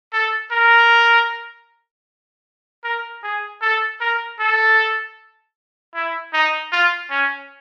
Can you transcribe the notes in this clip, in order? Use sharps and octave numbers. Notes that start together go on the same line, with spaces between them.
A4
A#4
A#4
G#4
A4
A#4
A4
E4
D#4
F4
C#4